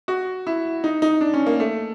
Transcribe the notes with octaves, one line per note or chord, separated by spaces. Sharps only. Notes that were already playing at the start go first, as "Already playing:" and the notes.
F#4
E4
D#4
D#4
D4
C#4
A#3
A3